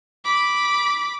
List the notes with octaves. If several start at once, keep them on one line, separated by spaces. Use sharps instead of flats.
B5 D6